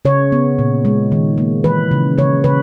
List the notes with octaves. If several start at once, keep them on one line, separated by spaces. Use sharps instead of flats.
C#3 C#5
B3
A#2
G#3
D#3
A#3
E3 B4
C#3
C#3 C#5
C#3 B4